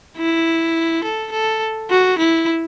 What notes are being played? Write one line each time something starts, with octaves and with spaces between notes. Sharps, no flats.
E4
A4
A4
F#4
E4